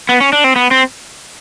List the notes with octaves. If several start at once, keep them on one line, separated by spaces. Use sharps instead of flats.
B3
C#4
D4
C4
B3
C4